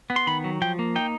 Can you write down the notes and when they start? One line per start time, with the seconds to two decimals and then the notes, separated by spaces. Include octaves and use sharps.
0.10 B3
0.16 C6
0.27 D#3 B5
0.44 F#3
0.62 F3 G5
0.79 A#3
0.95 D#4 G5